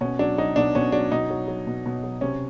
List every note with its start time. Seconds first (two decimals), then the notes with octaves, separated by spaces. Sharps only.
0.01 B2 C#4
0.19 F#3 D4
0.38 F#3 D#4
0.56 B2 D4
0.75 B2 C#4
0.92 F#3 D4
1.11 B2 D#4
1.30 F#3
1.48 F#3
1.67 B2
1.86 B2
2.03 F#3
2.21 C3 C#4